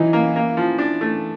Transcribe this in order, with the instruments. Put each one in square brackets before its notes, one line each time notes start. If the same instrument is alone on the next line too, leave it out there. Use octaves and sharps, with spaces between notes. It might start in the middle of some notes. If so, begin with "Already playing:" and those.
Already playing: [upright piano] E3 [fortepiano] F#3 D#4
[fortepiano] A#3
A#3
F3
D4
A3